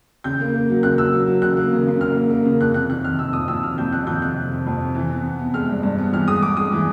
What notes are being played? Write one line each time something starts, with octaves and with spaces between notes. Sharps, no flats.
C#3 G6
A#3
A#3
F#3
C#3 F#6
F#3 E6
F#3
F#3
C#3 F#6
A#3
C#3
C#3
A#3 F6
A#3
A#3
C#3
F2 F#6
C3 F#6
D#3 F#6
C3 F6
C3 E6
F2 D#6
F2 E6
C3 F6
F2 G6
D#3 F#6
F2 G6
C3 F#6
C3
C3
F2
C3
E3
B3
B3
B3
G#3 F6
G2
G2
B3
E3 F6
G#3 D#6
G#3 D6
G#3 D#6
E3